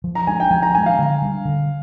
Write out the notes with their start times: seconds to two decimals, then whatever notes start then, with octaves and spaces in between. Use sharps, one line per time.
0.04 F3
0.15 A#5
0.27 G#3 D4 G#5
0.40 G5
0.51 F3 G#5
0.63 A#5
0.75 G#3 D4 G#5
0.86 F5
0.99 D3
1.22 G3 D4
1.45 D3